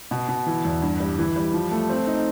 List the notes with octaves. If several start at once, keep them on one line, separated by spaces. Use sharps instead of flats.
B2
B2
E3
E2
G2
G3
E3
G3
F3
A3
C4
D#4